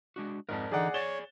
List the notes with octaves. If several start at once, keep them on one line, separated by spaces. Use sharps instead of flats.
G#3 D4 F#4
F2 G#2 A#4 D5 A5
D3 E3 F3 D#4 G#4 D5 F#5
G#4 C#5 D5 G#5 A6 E7 G7